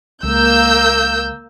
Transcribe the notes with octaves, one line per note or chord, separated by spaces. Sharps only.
C#2 A#3 E6 G6